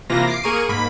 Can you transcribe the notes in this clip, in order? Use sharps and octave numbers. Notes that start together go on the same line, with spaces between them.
C3 E3 A#3 F4 A#6
D6 C7 D7
A#3 G#4 A#4 C#6 D#7
G#2 A#3 B5